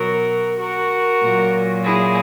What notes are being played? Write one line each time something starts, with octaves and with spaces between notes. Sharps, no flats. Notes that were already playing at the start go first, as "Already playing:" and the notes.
Already playing: B2 F#3 F#4 A#4
F#4 A#4
A#2 F#3
E4 G#4